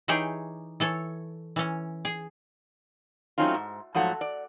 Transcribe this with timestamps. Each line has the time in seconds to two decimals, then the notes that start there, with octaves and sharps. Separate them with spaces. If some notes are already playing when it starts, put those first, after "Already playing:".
0.08 E3 D#4 G4 G#4 C#5 G5
0.80 E3 A4 C#5
1.56 E3 C#4
2.05 G#4
3.38 F#3 A3 C4 C#4 D#4 F4
3.54 G#2
3.95 G#2 F3 F#3 A3 F#5
4.21 D5